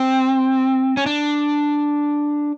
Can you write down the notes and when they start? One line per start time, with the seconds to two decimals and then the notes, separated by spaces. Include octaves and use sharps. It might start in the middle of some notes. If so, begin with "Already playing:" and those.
Already playing: C4
0.97 C#4
1.06 D4